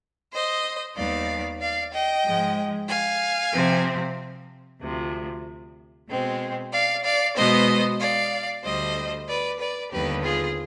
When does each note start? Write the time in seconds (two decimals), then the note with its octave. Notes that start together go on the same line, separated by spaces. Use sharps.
0.32 C5 D#5
0.96 D#2 D#3 G3 B3 D5 F5
1.60 D5 F5
1.92 D#5 G5
2.24 G#2 F3 G#3
2.88 F5 G#5
3.53 C3 F3 C4
4.81 D2 C3 F3
6.08 B2 G#3 C4
6.72 D5 F5
7.04 D5 F5
7.36 B2 G#3 B3 C5 D#5
8.00 D5 F5
8.64 D2 D3 G3 C5 D#5
9.27 B4 D5
9.60 B4 D5
9.91 D#2 D3 G3 B3 G4 B4
10.24 F4 G#4